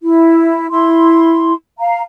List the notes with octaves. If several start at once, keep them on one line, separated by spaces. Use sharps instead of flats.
E4
E4 C6
F5 A#5